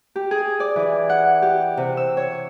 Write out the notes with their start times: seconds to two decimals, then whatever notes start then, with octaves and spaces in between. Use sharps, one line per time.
0.16 G4
0.31 G#4
0.60 D5
0.76 E3
1.09 F#5
1.42 G4
1.77 C3
1.97 E6
2.17 C#5